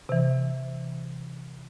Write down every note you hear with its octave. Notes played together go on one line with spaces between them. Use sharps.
C3 E3